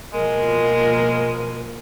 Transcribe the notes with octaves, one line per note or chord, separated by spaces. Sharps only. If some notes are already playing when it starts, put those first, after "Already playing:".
B2 F3 G#3 A#3 A#4